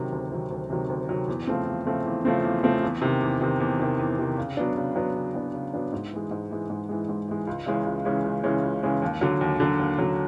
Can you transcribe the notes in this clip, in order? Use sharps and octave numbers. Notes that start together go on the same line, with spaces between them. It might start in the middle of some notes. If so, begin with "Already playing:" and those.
Already playing: C3 D#3 F#3
D2
C3 D#3 F#3
D2
C3 D#3 F#3
D2
C3 D#3 F#3
E2
C#3 F3 A3 C4
E2
C#3 F3 A3 C4
E2
C#3 F3 A3 C4
E2
C#3 F3 A3 C4
E2
C3 D#3
E2
C3 D#3
E2
C3 D#3
E2
C3 D#3
C#3
F#3 B3 D4
C#3
F#3 B3 D4
C#3
F#3 B3 D4
C#3
F#3 B3 D4
G#2
E3 G#3
G#2
E3 G#3
G#2
E3 G#3
G#2
E3 G#3
C#2
C#3 E3 G#3 C#4
C#2
C#3 E3 G#3 C#4
C#2
C#3 E3 G#3 C#4
C#2
C#3 E3 G#3 C#4
D#2
D3 F#3
D#2
D3 F#3
D#2
D3 F#3